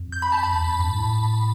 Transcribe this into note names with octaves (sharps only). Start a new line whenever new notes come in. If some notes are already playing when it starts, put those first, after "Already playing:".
Already playing: F2
G6
B5
A5
B5
E2
F2
G2
A2